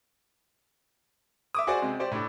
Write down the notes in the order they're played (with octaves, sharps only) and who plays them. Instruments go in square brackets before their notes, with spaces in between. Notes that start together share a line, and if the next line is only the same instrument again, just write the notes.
[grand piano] E5 D6 D#6
F#4 G#4 C5 D5
C3 G#3
G4 C5 D5
A2 D4